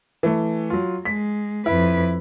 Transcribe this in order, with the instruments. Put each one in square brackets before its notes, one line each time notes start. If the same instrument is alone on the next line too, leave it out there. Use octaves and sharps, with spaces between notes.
[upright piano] E3 A3
F#3 F4
[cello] G#3 [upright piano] B6
[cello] F2 B4 [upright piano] E4